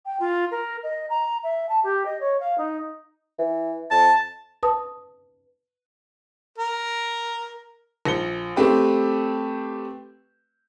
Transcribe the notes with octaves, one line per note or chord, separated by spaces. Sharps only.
G5
F4
A#4
D#5
A#5
E5
A5
G4
D#5
C#5
F5
D#4
E3
F2 A5
B4 A5 D#6
A#4
A#1 A#6 C#7 G7
A3 C4 G4 B4